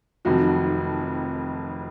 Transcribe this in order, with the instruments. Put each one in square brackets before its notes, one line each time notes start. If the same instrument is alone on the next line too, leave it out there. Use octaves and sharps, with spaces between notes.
[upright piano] F1 F2 D#3 F#3 F#4